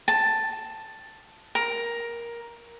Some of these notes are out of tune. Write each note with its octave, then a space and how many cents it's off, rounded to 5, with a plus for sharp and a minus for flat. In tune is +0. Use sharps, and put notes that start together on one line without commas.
A5 +5
A#4 +10